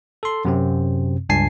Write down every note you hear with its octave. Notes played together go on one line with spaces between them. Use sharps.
A4 C6
F#2 C3 C4
C#2 G2 G#5 A5 C7